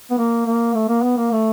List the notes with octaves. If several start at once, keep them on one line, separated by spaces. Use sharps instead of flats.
B3
A#3
A#3
A3
A#3
B3
A#3
A3